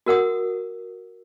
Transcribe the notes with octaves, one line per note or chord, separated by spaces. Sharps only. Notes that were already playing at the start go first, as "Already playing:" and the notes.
F#4 A#4 F#5 D#6